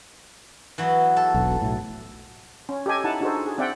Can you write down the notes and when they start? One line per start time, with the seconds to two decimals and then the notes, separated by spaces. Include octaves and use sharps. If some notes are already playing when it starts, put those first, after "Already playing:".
0.78 E3 F#3 B3
1.16 A4
1.34 E1 B1
1.62 B1 A2
2.69 C#4
2.86 G4 A4 D#5 G#5
3.04 D#4 E4 F#5 A5
3.21 D4 D#4 F#4 G#4 A4 C5
3.46 G#4
3.58 C4 D5 E5 F#5 G5